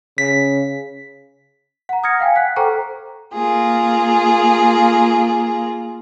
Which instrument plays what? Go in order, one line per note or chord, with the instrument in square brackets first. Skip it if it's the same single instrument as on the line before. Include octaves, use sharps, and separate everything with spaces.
[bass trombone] C#3 [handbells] B6
[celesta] F#5 A#5
D#6 F6 G#6 A#6 C#7
F5 G5 G#5
F#5 F#6 B6
A4 C5 G5 A#5 C#6
[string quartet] A#3 F4 G#4